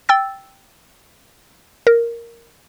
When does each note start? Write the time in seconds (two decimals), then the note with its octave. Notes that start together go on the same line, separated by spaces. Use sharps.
0.09 G5 E6 A6
1.87 A#4